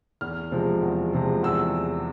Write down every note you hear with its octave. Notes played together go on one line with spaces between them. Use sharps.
E2 F6
C3 F3 G#3
E2
C3 F3 G#3
E2 E6